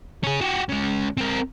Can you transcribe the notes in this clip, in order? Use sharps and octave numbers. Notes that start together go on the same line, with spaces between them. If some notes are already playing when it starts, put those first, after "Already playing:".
C#4 G#4
F#4 G4
C#3 G#3
C4 A#4